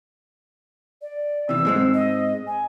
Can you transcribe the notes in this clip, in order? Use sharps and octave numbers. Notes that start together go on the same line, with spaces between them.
D5
C3 E3 E6
G#2 G#3 C4
D#5
G#5